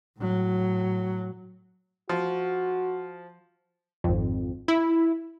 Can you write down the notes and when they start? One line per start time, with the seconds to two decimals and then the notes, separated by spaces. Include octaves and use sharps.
0.18 A2 F#3
2.09 F3 F#4
4.04 G#1 F2
4.68 E4